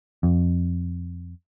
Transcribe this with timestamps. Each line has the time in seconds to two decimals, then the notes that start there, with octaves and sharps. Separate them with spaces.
0.23 F2